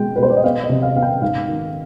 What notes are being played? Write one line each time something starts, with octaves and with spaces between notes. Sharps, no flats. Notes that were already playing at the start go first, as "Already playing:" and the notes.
Already playing: B2 G#3 G5
B4
B2 C5
D5
D#5
B3 F5
D#5
C3
F5
B3 F5
G5
G#2 F5
D#3